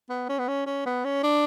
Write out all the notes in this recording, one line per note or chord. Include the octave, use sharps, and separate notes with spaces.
B3
C#4
B3
C#4
C#4
B3
C#4
D4